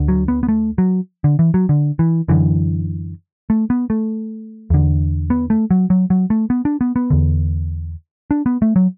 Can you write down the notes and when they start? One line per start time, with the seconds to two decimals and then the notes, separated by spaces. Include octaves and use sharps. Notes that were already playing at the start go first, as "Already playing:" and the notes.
Already playing: D2 D3
0.08 F#3
0.28 B3
0.43 B3
0.49 A3
0.78 F#3
1.24 D3
1.39 E3
1.54 F#3
1.69 D3
1.99 E3
2.28 F#2 D3 E3
3.50 A3
3.70 B3
3.90 A3
4.70 E2 D3
5.30 B3
5.50 A3
5.71 F#3
5.90 F#3
6.10 F#3
6.30 A3
6.50 B3
6.65 D4
6.81 B3
6.96 B3
7.10 E2 D3
8.31 D4
8.46 B3
8.62 A3
8.76 F#3